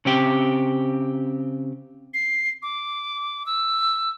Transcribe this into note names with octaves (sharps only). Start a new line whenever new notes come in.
C#3 C4 G4
C7
D6
E6